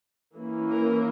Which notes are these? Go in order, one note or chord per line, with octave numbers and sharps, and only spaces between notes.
E3 A#3 C#4
A#4